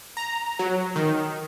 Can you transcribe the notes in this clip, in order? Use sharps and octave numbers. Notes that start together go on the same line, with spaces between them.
A#5
F#3
D#3